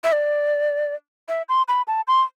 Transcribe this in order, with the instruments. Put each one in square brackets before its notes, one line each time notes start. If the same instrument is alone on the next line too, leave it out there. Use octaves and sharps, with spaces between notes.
[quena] E5
D5
E5
C6
B5
A5
C6